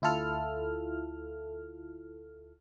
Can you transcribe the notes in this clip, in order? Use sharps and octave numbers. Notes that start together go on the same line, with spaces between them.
D2 E4 F4 A4 F6